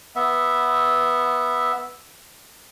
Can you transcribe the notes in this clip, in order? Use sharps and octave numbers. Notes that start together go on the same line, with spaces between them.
B3 E5